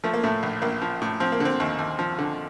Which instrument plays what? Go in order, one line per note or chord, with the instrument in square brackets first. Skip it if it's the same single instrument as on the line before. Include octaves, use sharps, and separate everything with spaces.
[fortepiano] F3 A3
A#3
A2 A3
A#1
A#1 A#3
F3
A2
F3 C4
A#3
D3 C4
D#2
D#2
F3
D3